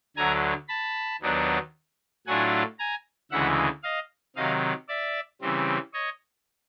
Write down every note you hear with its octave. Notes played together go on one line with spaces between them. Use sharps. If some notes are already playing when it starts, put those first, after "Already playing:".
D2 D3 F#3 G#5 A#5
A5 B5
D#2 D#3 F#3 B3 D4
A2 F#3 A3 D4 F4 F#5 G#5
G#5 A#5
D2 C#3 E3 G#3 E5 F#5
D#5 F5
C3 D#3 F#3 D#5 F5
D5 E5
C#3 E3 G3 C4
C#5 D#5